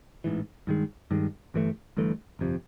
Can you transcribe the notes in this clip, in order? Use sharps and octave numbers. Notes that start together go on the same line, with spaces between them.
A1 G#2 E3
G2 D#3 G#3
G2 D#3 G#3
G1 G2 E3 A3
G1 G2 E3 A3
G1 F2 C3